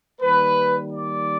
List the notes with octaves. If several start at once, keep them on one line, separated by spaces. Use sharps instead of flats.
D#3 G3 A#3 B4
D5